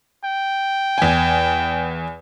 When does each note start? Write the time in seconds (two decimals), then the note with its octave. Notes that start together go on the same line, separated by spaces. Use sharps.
0.24 G5
0.98 E2 G#5